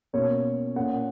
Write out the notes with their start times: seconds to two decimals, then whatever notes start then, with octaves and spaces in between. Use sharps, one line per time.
0.13 B2 A#3 C#4 C#5
0.76 A#2 A#3 C#4 F#5